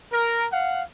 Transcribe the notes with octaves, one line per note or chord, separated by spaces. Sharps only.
A#4
F5 F#5